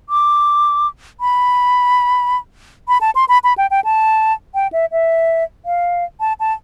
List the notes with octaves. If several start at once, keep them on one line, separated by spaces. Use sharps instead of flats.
D6
B5
B5
A5
C6
B5
B5
G5
G5
A5
G5
E5
E5
F5
A5
A5